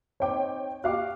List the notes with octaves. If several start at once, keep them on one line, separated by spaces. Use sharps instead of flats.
C4 D#4 C#5 G5 D6
F#4 G4 F5 D6 F#6